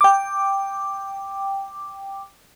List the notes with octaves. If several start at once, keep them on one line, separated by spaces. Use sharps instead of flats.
G5 D6